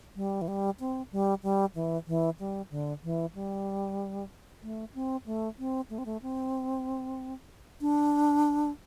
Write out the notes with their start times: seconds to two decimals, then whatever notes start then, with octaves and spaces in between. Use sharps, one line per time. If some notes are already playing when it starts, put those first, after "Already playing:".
0.16 G3
0.42 E3
0.48 G3
0.80 C4
1.12 G3
1.43 G3
1.75 E3
2.07 E3
2.39 G3
2.71 D3
3.04 E3
3.35 G3
4.63 A3
4.94 C4
5.26 A3
5.59 C4
5.90 A3
5.98 C4
6.06 A3
6.22 C4
7.81 D4